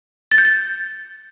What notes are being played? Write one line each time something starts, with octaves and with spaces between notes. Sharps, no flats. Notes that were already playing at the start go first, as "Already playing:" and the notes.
A6
G6
A6